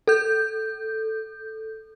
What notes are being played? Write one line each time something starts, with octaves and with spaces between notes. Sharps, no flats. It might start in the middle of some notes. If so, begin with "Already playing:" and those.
A4 G6